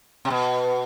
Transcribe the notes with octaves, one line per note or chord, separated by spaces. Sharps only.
C3
B2